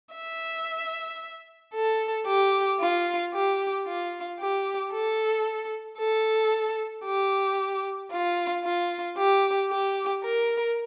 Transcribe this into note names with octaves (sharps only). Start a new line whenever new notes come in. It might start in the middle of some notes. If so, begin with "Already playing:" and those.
E5
A4
G4
F4
G4
F4
G4
A4
A4
G4
F4
F4
G4
G4
A#4